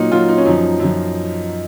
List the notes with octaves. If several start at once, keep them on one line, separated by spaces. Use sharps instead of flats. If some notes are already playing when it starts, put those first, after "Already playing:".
Already playing: A#2 F#3 D#4
A#2 F#3 F4
D#4
C#4
F#2 F3 D#4
F#2 F3